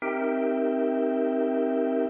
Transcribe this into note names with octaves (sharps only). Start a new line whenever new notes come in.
C4 D#4 G4 A#4 E5 G5